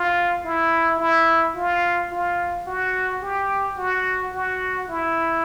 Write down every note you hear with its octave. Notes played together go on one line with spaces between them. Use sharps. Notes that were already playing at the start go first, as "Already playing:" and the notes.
Already playing: F4
E4
E4
F4
F4
F#4
G4
F#4
F#4
E4